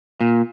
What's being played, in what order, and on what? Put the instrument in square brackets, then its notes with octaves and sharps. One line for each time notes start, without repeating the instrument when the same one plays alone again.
[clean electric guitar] A#2